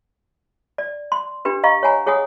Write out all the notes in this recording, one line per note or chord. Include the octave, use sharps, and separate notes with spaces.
D5
C6
D4 G4 B4
D#5 F5 A#5 C#6
C#5 F#5 G#5 A#5
G#4 C#5 F#5 G#5 D#6